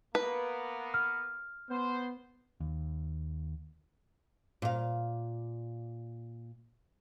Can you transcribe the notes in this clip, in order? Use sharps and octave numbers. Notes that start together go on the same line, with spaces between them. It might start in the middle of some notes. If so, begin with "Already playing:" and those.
A#3 B3 B4
F6
B3 C5
D#2
A#2 F5